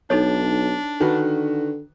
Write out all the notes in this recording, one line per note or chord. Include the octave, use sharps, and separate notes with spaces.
B1 D4 D#4 A4 C#5
D3 D#3 F#4 B4